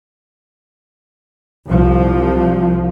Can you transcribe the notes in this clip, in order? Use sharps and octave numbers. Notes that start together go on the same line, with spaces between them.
C2 F3